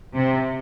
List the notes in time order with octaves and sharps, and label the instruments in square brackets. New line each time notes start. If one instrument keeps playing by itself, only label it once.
[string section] C3